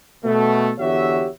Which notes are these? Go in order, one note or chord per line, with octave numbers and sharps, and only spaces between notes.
B2 A3
E2 D3 F#4 G4 C#5 E5